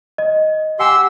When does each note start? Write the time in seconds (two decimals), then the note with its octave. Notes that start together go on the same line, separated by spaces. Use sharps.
0.18 D#5
0.80 G4 F#5 G#5 C6 E6